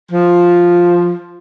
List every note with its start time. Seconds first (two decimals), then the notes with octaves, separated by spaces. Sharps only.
0.12 F3